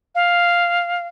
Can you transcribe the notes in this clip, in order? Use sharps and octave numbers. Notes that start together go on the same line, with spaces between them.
F5